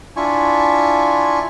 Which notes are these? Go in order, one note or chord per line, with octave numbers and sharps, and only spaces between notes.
D4 E4 F4 G#5 C#6